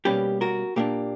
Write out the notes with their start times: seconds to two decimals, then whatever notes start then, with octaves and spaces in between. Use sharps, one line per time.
0.05 B2 G3 A#3 C#4 G4 B4
0.41 F#4 A#4
0.76 A#2 A#3 D4 G4